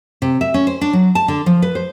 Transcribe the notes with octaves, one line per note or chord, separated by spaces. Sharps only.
C3
E5
C#4
C5
D4
F#3
A5
D3
F3
B4
C5